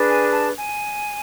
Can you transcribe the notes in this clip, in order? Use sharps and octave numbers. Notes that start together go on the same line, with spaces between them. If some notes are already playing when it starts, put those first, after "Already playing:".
Already playing: D4 G#4 B4
G#5
A5
G#5